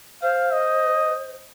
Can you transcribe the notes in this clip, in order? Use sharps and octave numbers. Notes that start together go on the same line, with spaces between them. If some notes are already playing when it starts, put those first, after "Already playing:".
C5 F5
D#5